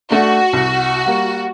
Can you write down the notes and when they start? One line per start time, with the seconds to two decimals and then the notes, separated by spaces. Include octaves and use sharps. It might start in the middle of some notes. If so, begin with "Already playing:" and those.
0.11 A3 D4 F#4
0.53 C2
1.06 G3 A#3